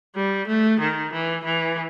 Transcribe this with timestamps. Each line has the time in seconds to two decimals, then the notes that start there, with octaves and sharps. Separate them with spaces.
0.16 G3
0.48 A3
0.80 D#3
1.12 E3
1.44 E3